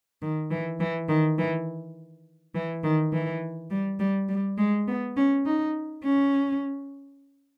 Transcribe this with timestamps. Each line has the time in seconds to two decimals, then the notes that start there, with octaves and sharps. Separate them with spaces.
0.22 D#3
0.51 E3
0.80 E3
1.09 D#3
1.38 E3
2.55 E3
2.83 D#3
3.13 E3
3.70 G3
4.00 G3
4.29 G3
4.58 G#3
4.88 B3
5.16 C#4
5.45 D#4
6.04 C#4